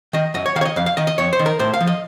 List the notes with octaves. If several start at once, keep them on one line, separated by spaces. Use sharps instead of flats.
D#3 D#5
F#2 D#5
C#5
D#3 F5
C#5
D#5
F2 F5
F5
D#3 D#5
D#5
F2 C#5
C5
D#3
A#4
A2 C5
F5
F3
D#5